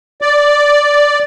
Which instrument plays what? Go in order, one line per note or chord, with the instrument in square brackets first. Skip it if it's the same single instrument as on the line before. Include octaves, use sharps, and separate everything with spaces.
[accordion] D5